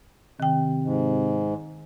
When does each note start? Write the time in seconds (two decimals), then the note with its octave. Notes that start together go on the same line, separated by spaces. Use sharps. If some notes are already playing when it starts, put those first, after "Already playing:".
0.40 C3 D#3 G5
0.83 G#2